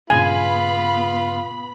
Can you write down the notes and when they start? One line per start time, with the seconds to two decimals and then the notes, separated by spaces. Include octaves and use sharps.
0.10 G2 A#2 C#3 B3 F4 G#5 B5